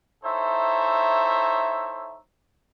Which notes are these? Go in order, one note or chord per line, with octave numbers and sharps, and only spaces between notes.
D#4 E4 A4 C5 C#5 E5